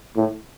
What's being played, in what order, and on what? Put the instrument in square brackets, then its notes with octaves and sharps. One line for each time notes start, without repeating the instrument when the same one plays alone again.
[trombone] A2